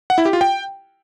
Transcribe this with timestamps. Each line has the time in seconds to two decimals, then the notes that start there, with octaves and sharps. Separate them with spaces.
0.10 F#5
0.18 E4
0.25 G4
0.33 F4
0.41 G5